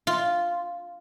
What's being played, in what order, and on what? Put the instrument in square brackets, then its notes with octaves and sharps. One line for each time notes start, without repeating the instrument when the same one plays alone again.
[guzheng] F4